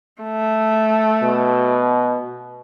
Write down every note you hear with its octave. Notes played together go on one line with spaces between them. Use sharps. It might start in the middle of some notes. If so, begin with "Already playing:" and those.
A3
B2